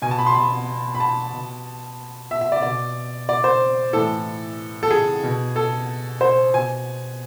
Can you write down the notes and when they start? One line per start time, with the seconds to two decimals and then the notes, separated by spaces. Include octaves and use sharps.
0.02 B2 G#5
0.11 A5
0.18 B5
0.26 C6
0.35 B5
0.95 B5
1.00 A5
1.33 B2
2.31 E5
2.41 E5
2.52 D5
2.62 B2 D5
3.29 D5
3.44 C5
3.93 A2 E3 A4
4.83 A4
4.91 G#4
5.23 B2
5.56 A4
6.21 C5
6.54 B2 G#5